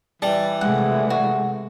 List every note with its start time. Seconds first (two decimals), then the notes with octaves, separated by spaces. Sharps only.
0.22 E3 G3 A5
0.61 C3 G#3 A3 F#5
1.10 F#4